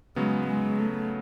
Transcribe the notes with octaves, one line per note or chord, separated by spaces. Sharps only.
C#3 F#3 G#3 B3
G#3
A3